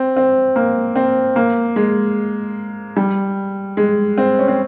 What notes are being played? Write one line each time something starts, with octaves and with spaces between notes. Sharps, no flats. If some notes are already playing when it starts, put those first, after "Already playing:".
Already playing: C4
C4
A#3
C4
A#3
G#3
G3
G#3
C4
C#4
C4